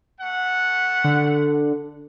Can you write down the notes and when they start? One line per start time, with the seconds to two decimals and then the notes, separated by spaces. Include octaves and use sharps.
0.20 A3 F#5
1.04 D3